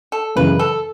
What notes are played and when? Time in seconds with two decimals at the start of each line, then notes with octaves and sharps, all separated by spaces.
0.12 A4
0.36 F#2 C#3 E3 G#3 B4
0.59 A4